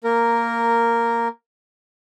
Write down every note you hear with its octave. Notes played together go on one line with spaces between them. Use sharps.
A#3 A#4